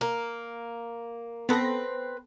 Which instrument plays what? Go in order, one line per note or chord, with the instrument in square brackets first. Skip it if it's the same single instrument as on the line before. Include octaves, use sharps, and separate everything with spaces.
[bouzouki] A#3
[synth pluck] B3 A4 A#6 [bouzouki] C4 B4